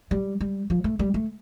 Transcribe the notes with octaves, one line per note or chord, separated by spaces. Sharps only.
G3
G3
F3
A3
G3
A3